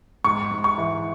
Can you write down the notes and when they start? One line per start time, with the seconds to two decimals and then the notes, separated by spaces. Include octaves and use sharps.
0.24 G#2 C#6
0.51 G#2
0.64 C#6
0.78 E3